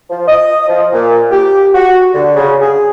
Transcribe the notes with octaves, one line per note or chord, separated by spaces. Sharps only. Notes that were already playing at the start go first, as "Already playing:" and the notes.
F3
D#5
F3
A#2
G4
F#4
D3
C#3
G#4